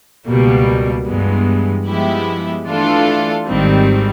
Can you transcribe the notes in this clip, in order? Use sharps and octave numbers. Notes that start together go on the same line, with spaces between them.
C#2 B2 G3 A#3
G2 E3 G#3 B3
F3 G#3 B3 E4 G4
E3 A3 D4 F4 A4
G#1 G#2 D#3 G3 C4